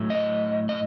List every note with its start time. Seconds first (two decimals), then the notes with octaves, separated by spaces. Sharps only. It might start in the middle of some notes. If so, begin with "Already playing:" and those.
Already playing: A2 F#3 A3
0.10 D#5
0.69 D#5